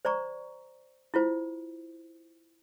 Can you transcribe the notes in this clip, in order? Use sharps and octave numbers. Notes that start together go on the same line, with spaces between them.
C5 D5 A#5 C#6
E4 F4 C5